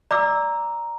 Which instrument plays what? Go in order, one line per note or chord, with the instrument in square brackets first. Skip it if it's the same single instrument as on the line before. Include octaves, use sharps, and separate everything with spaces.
[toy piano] D5 D6 E6 [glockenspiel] A#5